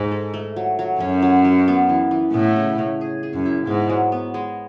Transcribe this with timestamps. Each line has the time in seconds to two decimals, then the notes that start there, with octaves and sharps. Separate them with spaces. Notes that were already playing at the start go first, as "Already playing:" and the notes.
Already playing: G#2 D#4
0.11 A4
0.34 A3
0.56 F#3
0.79 F#3
1.00 F#2 C#4
1.22 F#3
1.45 F#3
1.68 B3
1.89 E3
2.11 E3
2.33 A2 B3
2.56 C#3
2.79 C#3
3.01 G#4
3.23 G#4
3.34 F#2
3.46 E4
3.67 G#2 B3
3.89 F#3
4.12 B3
4.34 G#3